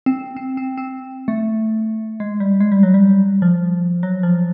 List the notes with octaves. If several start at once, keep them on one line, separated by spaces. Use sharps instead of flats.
C4
C4
C4
C4
A3
G#3
G3
G#3
G3
F#3
G3
F3
F#3
F3